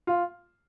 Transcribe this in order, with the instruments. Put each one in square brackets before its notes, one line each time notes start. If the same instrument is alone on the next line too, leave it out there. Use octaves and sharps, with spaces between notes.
[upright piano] F4